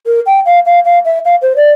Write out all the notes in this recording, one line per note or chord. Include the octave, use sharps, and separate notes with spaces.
A#4
G5
F5
F5
F5
E5
F5
C5
D5